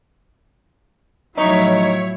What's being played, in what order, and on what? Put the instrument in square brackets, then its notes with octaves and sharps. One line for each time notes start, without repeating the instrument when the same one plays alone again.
[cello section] A2 F3 E4 [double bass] F#3 [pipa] D#4 [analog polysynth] C#5